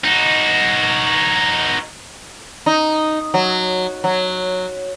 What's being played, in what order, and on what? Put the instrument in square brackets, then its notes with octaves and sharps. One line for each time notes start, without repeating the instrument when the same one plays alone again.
[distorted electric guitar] D#4 F#4
[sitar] D#4
F#3
F#3